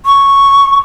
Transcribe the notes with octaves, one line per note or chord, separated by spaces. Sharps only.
C#6